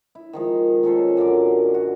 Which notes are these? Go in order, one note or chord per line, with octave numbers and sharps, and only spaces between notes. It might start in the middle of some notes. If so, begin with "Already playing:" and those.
E4
D#3 F3 G#3
A#2 C#4 A4 C5
F#2 D3 A#4 D6
F#4